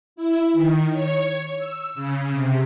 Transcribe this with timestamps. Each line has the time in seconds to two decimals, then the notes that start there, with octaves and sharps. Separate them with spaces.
0.16 E4
0.53 D#3
0.92 C#5
1.58 E6
1.94 C#3
2.33 C3